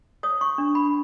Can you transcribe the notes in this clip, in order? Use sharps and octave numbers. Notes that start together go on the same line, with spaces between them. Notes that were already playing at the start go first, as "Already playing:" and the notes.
C#5 D#6
C#6
D4
B5